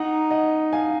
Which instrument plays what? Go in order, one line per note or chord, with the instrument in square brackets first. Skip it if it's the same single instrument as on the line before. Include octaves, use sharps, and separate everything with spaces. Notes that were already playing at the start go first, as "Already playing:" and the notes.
Already playing: [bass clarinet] D#4 [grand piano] F#5 A#5
[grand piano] D#5 F#5
F5 G#5